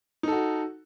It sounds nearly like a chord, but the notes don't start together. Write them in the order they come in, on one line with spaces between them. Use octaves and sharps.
D#4 A4 F#4